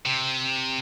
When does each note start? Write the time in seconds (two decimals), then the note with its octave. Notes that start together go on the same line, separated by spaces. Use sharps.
0.06 C3